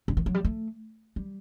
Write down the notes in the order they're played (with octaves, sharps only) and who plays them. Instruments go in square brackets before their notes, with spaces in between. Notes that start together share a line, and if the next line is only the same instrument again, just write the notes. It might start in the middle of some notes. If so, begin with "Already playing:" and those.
[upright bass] D3
D#3
F#3
G3
A3
G3